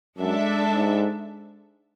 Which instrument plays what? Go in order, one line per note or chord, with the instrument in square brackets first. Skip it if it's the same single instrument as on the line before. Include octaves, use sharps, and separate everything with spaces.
[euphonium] F#2 [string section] G#3 D4 A4 E5
[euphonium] G#2